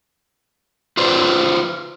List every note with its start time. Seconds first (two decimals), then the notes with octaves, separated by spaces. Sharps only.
0.97 F4 B4 C5 D5